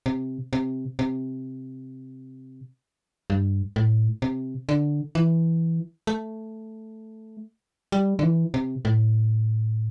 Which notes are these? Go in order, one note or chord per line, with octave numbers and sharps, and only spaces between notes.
C3
C3
C3
G2
A2
C3
D3
E3
A3
G3
D3
E3
C3
A2